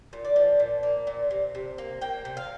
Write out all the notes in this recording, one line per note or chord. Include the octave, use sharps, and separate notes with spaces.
A#2
D5
F3
A#2
A#3
A#2
C3
C3
A#3
A#3 G5
C3
F5